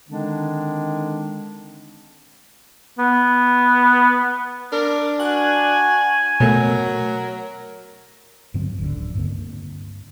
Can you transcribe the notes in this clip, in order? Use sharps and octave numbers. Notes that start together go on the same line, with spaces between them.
D3 D#3 G#3 C4 D4 D#4
B3
D4 A#4
F#4 G#5 F#6
B2 F#3 A3 A#4
G2 D3 F#3 C4
D1 G#1 C#2 D3
G2 D3 A#3 C4